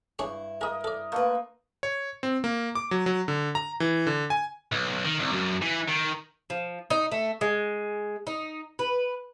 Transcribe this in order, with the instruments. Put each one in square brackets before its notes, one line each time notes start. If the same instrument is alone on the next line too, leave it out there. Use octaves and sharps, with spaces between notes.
[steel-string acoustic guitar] G2 E4 [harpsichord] D4 G#4 C#5
[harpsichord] G#4 E5 [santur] A#4 D#5 D#6
[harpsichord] A4 D5
[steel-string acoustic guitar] D3 B4 [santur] A3 A#3
[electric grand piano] C#5
C4
A#3
D6
F#3
F#3
D3
A#5
E3
D3
G#5
[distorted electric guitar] B1
D#3
C2
F#2
E3
D#3
[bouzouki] F3
D#4
A3
G#3
D#4
B4